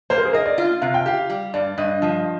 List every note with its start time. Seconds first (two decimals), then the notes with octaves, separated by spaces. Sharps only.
0.10 A#3 C5
0.18 A#4
0.25 G#4
0.33 A#4 D#5
0.46 D5
0.58 F4
0.82 C3 F5
0.94 G5
1.06 G4 F5
1.30 G3
1.54 G2 D5
1.78 G2 D#5
2.02 F3 D#5